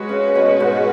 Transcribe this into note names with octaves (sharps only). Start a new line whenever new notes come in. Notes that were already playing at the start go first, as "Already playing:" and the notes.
Already playing: G#3 C#4 F#4 B4
C#3
B2
G#2